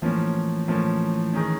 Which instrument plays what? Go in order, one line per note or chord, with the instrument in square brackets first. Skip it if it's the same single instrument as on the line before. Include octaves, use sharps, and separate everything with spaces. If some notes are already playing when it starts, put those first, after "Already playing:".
[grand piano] A2 F3 A#3 C#4 [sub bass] E3
[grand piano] A2 F3 A#3 C#4
D#3 G#3 C#4